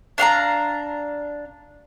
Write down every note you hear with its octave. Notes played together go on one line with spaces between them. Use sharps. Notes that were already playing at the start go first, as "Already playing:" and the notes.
D4 F5 F#5 A#5